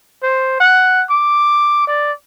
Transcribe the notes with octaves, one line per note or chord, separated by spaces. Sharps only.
C5
F#5
D6
D5